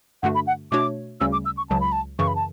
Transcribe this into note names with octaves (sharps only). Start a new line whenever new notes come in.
G2 D3 A3 D4 F#4 F#5
B5
F#5
B2 A3 D4 F#4 C#5 D6
D2 C#3 G3 C#4 E6
D6
E6
C#6
C#2 C#3 F#3 A5
B5
A5
F#2 C#3 E3 C#6
B5
A5